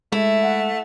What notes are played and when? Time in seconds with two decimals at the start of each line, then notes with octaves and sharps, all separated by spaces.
0.12 G#3 A3 E4
0.42 F#5